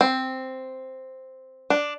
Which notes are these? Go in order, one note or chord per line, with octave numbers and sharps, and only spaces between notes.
C4
D4